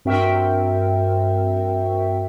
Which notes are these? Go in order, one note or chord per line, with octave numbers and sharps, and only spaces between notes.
G2 C4 F#4 A#4 E5 G5